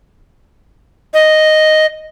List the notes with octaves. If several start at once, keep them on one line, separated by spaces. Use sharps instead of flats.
D#5